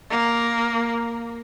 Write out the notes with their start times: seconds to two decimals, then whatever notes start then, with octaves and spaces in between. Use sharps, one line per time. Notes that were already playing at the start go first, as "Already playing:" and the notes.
0.10 A#3